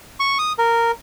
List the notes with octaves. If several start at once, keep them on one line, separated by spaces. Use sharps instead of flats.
C#6
D#6
A#4